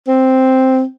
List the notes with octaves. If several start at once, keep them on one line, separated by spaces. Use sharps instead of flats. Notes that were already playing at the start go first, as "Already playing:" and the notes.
C4